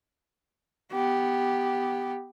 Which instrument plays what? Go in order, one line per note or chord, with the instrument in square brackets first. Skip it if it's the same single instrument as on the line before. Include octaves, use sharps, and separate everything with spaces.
[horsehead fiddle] B3 G4